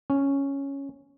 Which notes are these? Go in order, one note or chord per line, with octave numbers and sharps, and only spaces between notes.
C#4